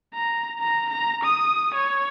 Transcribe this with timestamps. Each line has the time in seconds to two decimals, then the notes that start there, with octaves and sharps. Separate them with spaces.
0.14 A#5
0.60 A#5
0.90 A#5
1.24 D#6
1.74 C#5